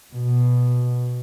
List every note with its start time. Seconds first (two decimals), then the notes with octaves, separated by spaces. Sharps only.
0.14 B2